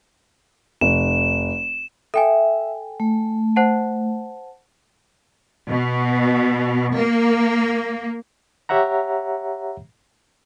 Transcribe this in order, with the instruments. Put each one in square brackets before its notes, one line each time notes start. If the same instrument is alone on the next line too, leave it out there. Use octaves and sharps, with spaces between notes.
[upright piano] F1 [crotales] E7
[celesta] A4 G5 G#5 [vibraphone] E5
[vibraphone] A3
[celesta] C5 F#5 A5
[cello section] B2
A#3
[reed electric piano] G4 C#5 E5 F#5 A#5